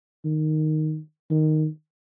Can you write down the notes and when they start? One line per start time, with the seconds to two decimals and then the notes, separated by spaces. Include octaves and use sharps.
0.25 D#3
1.30 D#3